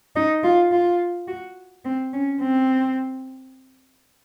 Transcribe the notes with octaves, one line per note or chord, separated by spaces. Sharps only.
D#4
F4
F4
F#4
C4
C#4
C4